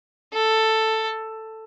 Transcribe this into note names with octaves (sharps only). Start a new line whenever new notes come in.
A4